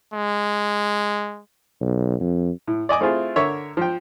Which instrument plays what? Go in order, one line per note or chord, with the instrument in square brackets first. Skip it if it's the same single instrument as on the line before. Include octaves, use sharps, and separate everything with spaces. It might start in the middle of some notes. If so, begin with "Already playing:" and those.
[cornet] G#3
[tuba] B1
F2
[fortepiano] A2
D5 D#5 G#5 D6
A3 C4 E4 F4 G#4
D3 A#4 C#5 E5
F3 G5